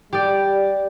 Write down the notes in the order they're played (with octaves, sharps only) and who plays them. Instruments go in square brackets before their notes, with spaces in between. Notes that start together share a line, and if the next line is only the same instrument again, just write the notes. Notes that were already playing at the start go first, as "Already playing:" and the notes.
[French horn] G3 [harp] G4 D5